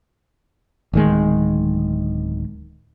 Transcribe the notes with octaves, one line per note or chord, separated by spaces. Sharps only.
D1 D#3 G#3